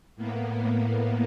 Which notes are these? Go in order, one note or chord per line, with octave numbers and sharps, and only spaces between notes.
A2 A#3 B3